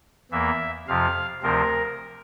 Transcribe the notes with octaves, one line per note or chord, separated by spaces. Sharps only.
E2 E3 A#3 E5
F2 C3 F3 F5
D2 C3 F3 C4 A#4